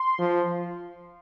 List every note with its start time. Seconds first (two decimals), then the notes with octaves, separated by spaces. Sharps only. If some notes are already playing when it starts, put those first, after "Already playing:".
Already playing: C6
0.19 F3